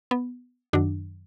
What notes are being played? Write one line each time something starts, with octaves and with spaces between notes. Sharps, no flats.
B3
F#2 D#3 F#3 D4